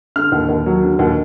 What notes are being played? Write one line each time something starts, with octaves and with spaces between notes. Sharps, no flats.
D3 F6
D#2
D#2
F#3
D3
D#2